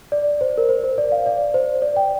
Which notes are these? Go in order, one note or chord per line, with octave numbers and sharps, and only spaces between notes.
D5
C5
A#4
C5
C5
D5
F5
D5
C5
D5
G5